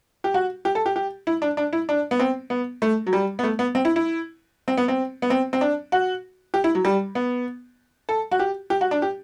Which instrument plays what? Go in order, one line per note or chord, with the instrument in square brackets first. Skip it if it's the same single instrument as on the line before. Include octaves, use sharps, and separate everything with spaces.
[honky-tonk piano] G4
F#4
G4
A4
G4
G4
E4
D4
D4
E4
D4
B3
C4
B3
A3
F#3
G3
B3
A3
B3
C4
E4
E4
C4
B3
C4
B3
C4
C4
D4
F#4
G4
E4
F#3
G3
B3
A4
F#4
G4
G4
F#4
D4
G4